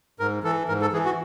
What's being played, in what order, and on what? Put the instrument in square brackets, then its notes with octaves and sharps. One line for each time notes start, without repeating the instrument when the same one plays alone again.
[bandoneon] G#2 A#4
E3 A4
G#2 A#4
A4
E3 G#4
F#4